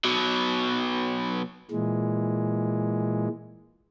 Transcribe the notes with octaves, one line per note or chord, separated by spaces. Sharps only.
B2 F#3
A#2 E3 G#3